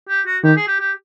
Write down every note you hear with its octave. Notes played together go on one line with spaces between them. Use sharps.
G4
F#4
D#3 G4
G#4
G4
G4